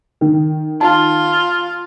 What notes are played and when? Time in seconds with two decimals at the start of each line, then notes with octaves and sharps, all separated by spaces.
0.21 D#3
0.81 F4 A5